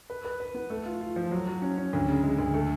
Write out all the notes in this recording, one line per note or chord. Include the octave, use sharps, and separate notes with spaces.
B4
B4
B4
B3
A3
F4
F4
F3
F#3
F#3
C#4
C#4
D2
C#3
G#3
D2
A3